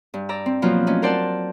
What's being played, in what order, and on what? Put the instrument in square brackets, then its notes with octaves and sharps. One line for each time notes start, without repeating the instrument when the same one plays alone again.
[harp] G2
D5 A#5 E6
C4
B2 F3 F#3 A#3 F4
A3 C#4 D#4
A#4 C5 D5 F#5 A5